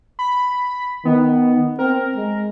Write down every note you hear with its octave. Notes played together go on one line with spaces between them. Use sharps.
B5
D#3 B3
C4 A#4
G#3